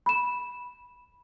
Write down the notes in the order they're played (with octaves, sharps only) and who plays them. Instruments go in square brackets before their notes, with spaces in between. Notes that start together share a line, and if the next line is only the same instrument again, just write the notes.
[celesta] B5 E7